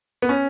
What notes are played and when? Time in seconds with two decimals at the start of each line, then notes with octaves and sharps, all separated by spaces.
0.22 B3
0.29 C#4